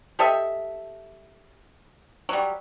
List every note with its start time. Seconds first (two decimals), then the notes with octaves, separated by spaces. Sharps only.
0.19 G4 A4 D#5 E5
2.29 F#3 G3